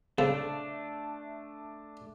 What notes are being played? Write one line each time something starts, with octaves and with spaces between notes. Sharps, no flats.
C#3 A3 C4 D4 A4